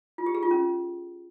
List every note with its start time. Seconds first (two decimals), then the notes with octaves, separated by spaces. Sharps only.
0.18 F4
0.26 G4
0.35 G#4
0.43 F4
0.51 C#4